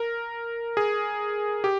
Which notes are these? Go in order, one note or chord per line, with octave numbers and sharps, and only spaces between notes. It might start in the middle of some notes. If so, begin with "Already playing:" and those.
Already playing: A#4
G#4
G4